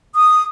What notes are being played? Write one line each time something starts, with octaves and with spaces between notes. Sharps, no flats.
D#6